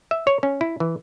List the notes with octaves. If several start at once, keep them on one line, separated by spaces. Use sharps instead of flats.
E5
C#5
C#4
E4
E3